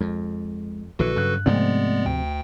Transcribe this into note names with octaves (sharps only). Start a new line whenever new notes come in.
F2 G#3
A#1 D3 E3 F#4 A4 B4
G2 C#3 F#3 F#6
G#2 C3 F3 G#3 A3 B3 C4 D5
D2 G5